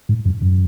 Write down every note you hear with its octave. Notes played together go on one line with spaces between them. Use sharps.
G#2
F#2
F#2